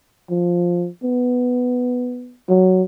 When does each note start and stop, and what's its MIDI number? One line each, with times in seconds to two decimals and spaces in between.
0.30 0.87 53
1.03 2.36 59
2.49 2.83 54